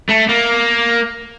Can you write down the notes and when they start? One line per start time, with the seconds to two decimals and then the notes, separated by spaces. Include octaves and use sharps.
0.09 A3
0.29 A#3